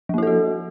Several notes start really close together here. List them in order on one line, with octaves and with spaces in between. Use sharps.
F3 A#3 E4 A4 F#4